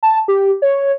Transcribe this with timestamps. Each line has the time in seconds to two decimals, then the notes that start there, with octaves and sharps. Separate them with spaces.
0.03 A5
0.28 G4
0.62 C#5